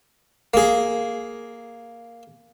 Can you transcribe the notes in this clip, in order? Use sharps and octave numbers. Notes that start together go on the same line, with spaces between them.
A#3 G#4